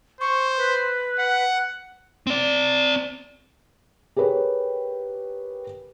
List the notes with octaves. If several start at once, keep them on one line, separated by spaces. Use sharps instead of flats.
C5 C#6
B4
F#5
C4 D5
G4 G#4 A#4 B4 C#5